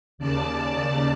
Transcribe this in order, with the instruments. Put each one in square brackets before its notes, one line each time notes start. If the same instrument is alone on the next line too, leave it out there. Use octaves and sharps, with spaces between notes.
[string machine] D#2 C#3 D5 A5